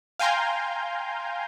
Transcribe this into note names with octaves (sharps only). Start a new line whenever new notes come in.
F5 G5 G#5 A#5 C6 G6